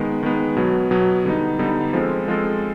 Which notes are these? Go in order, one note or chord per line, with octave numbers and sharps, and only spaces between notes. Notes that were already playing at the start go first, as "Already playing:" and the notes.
Already playing: D#3 G#3 B3
D#3 G#3 B3
B2 F#3 B3
B2 F#3 B3
D3 G3 B3 D#4
D3 G3 B3 D#4
F3 G#3 C4 F4 A4
F3 G#3 C4 F4 A4